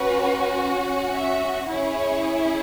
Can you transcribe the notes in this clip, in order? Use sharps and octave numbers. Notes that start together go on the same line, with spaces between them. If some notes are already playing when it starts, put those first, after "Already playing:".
Already playing: C#4 F#4 B4
E5
C#4 E4 G#4 C#5